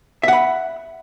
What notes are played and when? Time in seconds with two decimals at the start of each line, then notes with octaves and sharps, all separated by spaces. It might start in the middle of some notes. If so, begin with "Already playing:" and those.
0.23 E5
0.28 F#5
0.33 B5